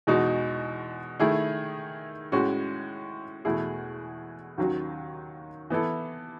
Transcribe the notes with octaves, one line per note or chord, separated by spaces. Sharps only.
E2 B2 G#3 D#4 F#4
D#3 A3 E4 G#4
A2 G#3 C#4 F#4
E2 B2 A3 E4 G#4
D#2 D#3 F#3 C#4 F#4
E3 B3 E4 A4